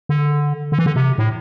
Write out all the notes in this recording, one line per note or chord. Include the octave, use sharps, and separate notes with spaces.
D3
D3
E3
D3
C3
A2